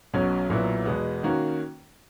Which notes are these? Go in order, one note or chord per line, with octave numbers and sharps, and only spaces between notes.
B1 B2 F#3 C#4
B1 A#2 F#3 B3 E4
E2 B2 G#3 B3
D#3 A#3 C#4 F#4